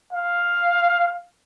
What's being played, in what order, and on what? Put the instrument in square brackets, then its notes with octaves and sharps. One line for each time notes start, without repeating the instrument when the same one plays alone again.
[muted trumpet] F5